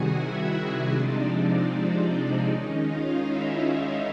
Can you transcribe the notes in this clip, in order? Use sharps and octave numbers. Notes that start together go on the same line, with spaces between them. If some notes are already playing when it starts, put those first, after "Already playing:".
Already playing: C3 D#3 G3 F#4 G#4 F#5 G#5
E4 E5
C3 F3 G#3 C4 D4 D#4 D5
D4 D5
D4 D5
D4 D5
D#3 G#3 C#4 D#4 D#5
F4 F5
E4 E5